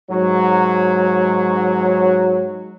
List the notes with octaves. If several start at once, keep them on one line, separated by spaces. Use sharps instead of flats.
G#2 F#3